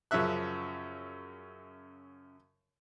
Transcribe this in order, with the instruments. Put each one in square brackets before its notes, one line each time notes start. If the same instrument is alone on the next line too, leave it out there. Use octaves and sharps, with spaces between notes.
[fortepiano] F#2 C#3 F3 E5 F#6